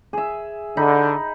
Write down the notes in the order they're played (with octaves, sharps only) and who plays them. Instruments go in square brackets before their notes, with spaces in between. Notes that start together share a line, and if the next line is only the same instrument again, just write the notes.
[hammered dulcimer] G#4 E5
[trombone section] D3 [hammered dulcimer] D#4 B5